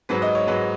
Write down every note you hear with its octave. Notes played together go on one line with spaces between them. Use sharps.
G#2 F#3 B4
D#5
C#5
G#2 F#3 B4